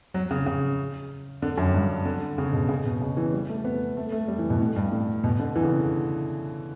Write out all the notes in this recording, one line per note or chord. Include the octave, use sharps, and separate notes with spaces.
F#3
C#3
C#3
D3
F#2
G2
D3
C#3
B2
C#3
B2
C#3
E3
G3
A3
B3
A3
A3
G3
E3
B2
A2
G2
A2
B2
D3
E3
C#3
D3